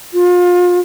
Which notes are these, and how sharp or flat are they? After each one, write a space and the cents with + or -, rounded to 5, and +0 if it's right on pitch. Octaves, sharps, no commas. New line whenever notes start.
F4 +35